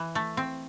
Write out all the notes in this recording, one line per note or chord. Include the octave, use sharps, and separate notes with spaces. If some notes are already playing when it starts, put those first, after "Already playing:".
Already playing: E3
A3
C4